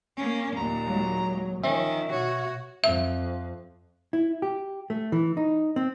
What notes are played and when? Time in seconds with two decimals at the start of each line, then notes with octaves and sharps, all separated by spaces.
0.17 A#3 C#4
0.57 D#2 A#2 A#5
0.85 F#3 G#3
1.64 D#3 F3 C#4 E5
2.12 B2 F#4 C#5
2.84 F2 E5
4.13 E4
4.42 G4
4.90 A3
5.12 E3
5.37 D#4
5.76 C4